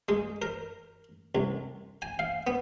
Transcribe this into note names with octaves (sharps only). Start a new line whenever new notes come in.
G#3
A#4
C2
G#5
F5
B3